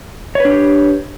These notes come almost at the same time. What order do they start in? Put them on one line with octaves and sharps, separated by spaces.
C#5 B4 D4 G4